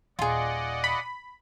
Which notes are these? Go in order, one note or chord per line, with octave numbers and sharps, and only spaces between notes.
D#1 F4 G#4 D5 D#5 F#5
B5